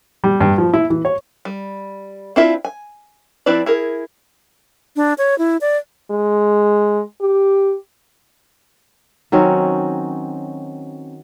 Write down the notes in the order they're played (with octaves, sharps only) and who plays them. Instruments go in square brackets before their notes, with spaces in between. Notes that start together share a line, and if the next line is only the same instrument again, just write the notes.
[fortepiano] G3
G2
F3
E4
E3
C#5
[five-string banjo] G3
C4 D4 E4 F4 E5
G#5
F3 C4 E4 B4 D5
E4 G#4 A#4
[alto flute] D4
C#5
E4
D5
[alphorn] G#3
G4
[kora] D#3 F#3 C4 C#4